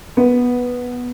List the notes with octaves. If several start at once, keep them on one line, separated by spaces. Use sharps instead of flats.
B3